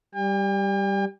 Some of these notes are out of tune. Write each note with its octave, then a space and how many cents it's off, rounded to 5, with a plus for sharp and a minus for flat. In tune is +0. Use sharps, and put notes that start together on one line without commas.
G3 +0 G5 +45